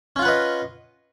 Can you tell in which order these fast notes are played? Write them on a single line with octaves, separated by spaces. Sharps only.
C#4 F4 F#5 B4 D#5